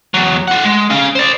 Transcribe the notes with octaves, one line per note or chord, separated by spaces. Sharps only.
E2 F#3
F4 F#5
G#3
C#4 F5
C5 D5